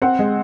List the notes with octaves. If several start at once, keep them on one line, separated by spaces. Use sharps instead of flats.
C4 F#5
G#3